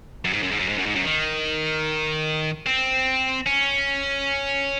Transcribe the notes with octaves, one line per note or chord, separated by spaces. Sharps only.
F#2
G#2
F#2
G#2
F#2
G#2
F#2
G#2
F#2
D#3
C4
C#4